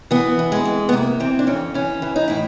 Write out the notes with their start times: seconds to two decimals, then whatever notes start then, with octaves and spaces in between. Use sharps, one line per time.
0.11 E3 B3
0.39 E3
0.52 G#3
0.65 F2
0.89 B3
0.92 C3 A#3
1.20 E3 C4
1.39 D4
1.47 F2 C#4
1.74 E3 C#4
2.02 E3
2.16 D#4
2.28 A2 E4